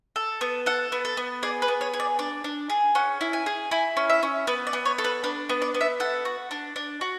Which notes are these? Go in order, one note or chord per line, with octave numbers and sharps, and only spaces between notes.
A4
B3
A4 F#5
B3
A4
B3
G#4 D5
B4
B3
C#5
G#4
D5
D4 D5
D4
G#4
C#4 F#5
E4
G#5
G#4
E4 G#5
C#4
E5
C#4
B3 B4
D5
B3
C#5
A4
B4
D4 B4
B3
D5
B3
E5
A4 F#5
F#4
D4
D4
F#4